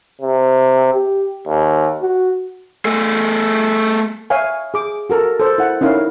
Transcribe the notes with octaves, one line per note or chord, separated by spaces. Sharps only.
C3
G4
D#2
F#4
A3 G#4
C#5 E5 F5 G#5
G#4 D6
F#4 A4 A#4 A5
A4 C5
E4 F#5
C#4 D#4 E4 A#4 C#5 F5